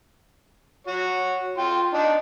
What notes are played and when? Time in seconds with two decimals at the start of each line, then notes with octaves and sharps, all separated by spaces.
0.87 F#4 C#5
1.58 F4 G5
1.93 D4 D#4